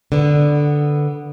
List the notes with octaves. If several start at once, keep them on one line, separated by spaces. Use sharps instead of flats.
D3 B3